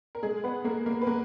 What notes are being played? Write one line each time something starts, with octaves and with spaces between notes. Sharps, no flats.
A#4
B1 G#3 G#4
B3 B4
G#3 A#3 A#4
A#3 A#4
B4
A#3 A#4